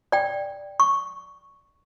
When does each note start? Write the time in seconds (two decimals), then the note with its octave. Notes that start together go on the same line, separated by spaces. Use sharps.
0.12 D5 G5
0.80 C#6